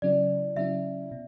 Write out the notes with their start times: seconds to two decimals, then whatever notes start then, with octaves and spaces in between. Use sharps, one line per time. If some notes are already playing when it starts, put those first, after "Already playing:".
0.02 C#3 F#3 C#4 E4 D5
0.56 C#3 F#3 C#4 E4 E5
1.12 B2